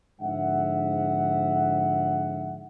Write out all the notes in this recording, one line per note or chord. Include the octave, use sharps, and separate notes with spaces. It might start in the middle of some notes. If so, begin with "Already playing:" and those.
F2 G#2 D3 E5 F#5